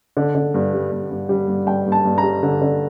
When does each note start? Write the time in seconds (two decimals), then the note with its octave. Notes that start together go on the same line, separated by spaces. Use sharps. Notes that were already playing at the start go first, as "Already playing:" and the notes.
0.17 D3
0.35 D3
0.54 G2
0.73 G3
0.92 G2
1.11 G2
1.29 G3
1.48 G2
1.66 G2 G5
1.86 G2
1.92 A5
2.05 G2
2.18 A#5
2.23 G3
2.43 D3
2.62 D3